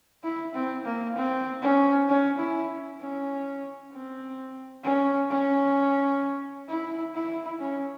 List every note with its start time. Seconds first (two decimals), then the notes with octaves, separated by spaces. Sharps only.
0.24 E4
0.55 C4
0.85 A#3
1.16 C4
1.62 C#4
2.09 C#4
2.38 E4
3.00 C#4
3.93 C4
4.84 C#4
5.30 C#4
6.69 E4
7.15 E4
7.60 C#4